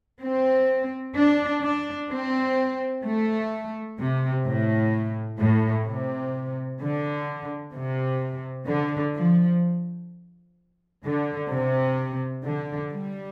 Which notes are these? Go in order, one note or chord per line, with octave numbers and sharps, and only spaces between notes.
C4
D4
D4
C4
A3
C3
A2
A2
C3
D3
C3
D3
F3
D3
C3
D3
G3